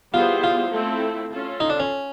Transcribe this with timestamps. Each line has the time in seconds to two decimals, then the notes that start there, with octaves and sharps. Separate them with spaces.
0.13 G3 B3 E4 F4 G#4 C5
0.44 F4
0.72 A3 C4 E4 A4
1.31 C#4 F4 A4
1.60 D#4
1.70 D4
1.80 C#4